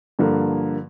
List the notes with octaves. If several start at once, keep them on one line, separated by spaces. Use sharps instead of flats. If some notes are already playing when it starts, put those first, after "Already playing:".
G2 D3 F3 A#3